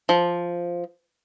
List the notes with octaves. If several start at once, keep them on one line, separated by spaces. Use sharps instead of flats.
F3